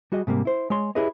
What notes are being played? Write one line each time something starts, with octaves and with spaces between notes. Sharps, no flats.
G3 F#4 G#4 D#5
G#2 C3 G3 A#3
E4 C5
G#3 C#5 C6
E4 G4 G#4 B4 C#5 D#5